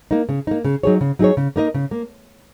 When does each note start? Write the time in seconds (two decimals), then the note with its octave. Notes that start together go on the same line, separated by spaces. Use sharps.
0.11 A#3 D#4
0.29 C#3
0.47 A#3 D#4
0.65 C#3
0.83 F#3 D#4 G#4 C#5
1.01 C#3
1.19 F#3 D#4 G#4 C#5
1.37 C#3
1.56 A#3 D#4 A#4 D#5
1.74 C#3
1.91 A#3